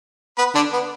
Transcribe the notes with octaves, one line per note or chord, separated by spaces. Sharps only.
B3 B4
D3 D4
B3